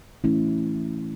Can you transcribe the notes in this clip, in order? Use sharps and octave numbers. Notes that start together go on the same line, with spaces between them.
E3 A3 C#4 E4